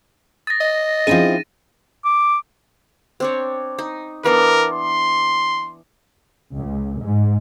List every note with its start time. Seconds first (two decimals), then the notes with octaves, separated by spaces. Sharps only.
0.47 D#6 A6 A#6
0.61 D#5
1.07 F3 C4 C#4 D#4 E4 G#4 D#7
2.05 D6
3.20 C4 D4 C#5
3.79 D#4
4.24 E3 B3 D4 A#4
4.73 C6
6.53 C#2
7.02 G#2